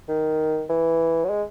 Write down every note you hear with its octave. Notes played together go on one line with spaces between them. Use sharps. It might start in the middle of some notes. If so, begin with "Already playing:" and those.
D#3
E3
F#3
G#3